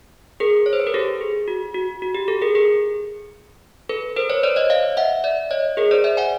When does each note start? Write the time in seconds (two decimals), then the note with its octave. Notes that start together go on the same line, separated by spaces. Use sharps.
0.40 G#4 A#4
0.66 C#5
0.73 C5
0.80 B4
0.87 A#4
0.94 G4 A4
1.21 G#4
1.48 F#4
1.74 F#4
2.02 F#4
2.15 G4
2.28 G4 A4
2.42 G#4 A#4
2.55 G#4 A#4
3.89 A4 B4
4.16 A#4 C5
4.30 B4 C#5
4.43 C5 D5
4.56 C#5 D#5
4.70 D#5 F5
4.97 E5 F#5
5.24 D5 E5
5.51 C#5 D#5
5.77 G#4 A#4
5.91 C5 D5
6.04 D5 E5
6.17 F#5 G#5